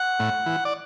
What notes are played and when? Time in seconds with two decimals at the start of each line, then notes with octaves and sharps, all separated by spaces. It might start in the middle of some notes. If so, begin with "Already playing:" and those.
Already playing: F#5
0.20 A2
0.46 E3
0.65 D5